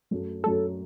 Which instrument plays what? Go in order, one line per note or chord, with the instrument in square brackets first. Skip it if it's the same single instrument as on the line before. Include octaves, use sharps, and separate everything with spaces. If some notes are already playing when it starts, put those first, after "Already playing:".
[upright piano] F#2 F#3 A3
[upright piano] F#2 F#3 A3 [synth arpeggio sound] A4